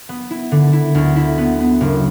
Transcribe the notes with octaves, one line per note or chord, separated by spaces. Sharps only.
B3
E4
D3
E4
D2
E4
B3
B3
F#1